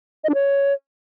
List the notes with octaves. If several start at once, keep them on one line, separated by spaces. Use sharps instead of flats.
D#5
D4
C#5